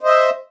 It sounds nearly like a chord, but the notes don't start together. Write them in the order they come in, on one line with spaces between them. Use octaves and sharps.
C5 D#5 E5